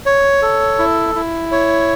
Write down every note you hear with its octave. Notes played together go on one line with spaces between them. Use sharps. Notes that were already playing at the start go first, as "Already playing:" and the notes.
C#5
A4
E4
E4
C#5